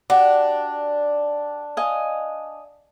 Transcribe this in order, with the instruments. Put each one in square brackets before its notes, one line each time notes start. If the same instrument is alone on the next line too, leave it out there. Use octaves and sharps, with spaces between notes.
[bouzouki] D4 [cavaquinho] F#4 G4
[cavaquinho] D#5 F5 G#5